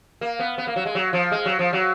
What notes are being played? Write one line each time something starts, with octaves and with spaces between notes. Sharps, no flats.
A#3
B3
B3
A#3
F#3
G#3
F#3
F3
G#3
F#3
F3
F#3